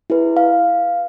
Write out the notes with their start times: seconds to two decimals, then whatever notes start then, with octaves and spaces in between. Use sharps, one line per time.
0.10 E4 G#4 B4
0.37 F5